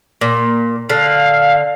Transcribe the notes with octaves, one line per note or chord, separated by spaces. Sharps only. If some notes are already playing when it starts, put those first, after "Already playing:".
A#2
D3 F5